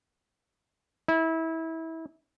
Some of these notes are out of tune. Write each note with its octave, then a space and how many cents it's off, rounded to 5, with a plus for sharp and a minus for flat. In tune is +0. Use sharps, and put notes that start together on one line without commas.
E4 -25